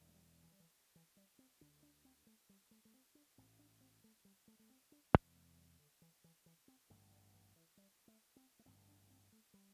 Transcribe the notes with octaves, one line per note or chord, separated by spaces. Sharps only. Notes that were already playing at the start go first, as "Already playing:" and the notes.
Already playing: E1 E2 D3
A3
G3
E3
G3
E3
E3
G3
C4
D2 D3 D4
D4
C4
A3
G3
A3
A3
C4
D4
A1 A2 C4
D4
C4
A3
G3
A3
A3
C4
D4
E1 C4
E2 C3
A3
G3
D3
E3
E3
E3
C4
A1 G2 D3 A3
G3
E3
E3
G3
A3
C4
A3
A1 G2 D3 C4
D4
C4
A3
G3